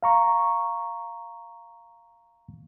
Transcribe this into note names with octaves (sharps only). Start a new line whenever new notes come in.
F5 A#5 C#6